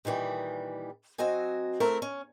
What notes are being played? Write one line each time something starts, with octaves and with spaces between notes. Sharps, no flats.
A#2 D#3 E3 G3
F#3 C4 F#4 D#5 G#5
A3 C4 E4 A#4
C#4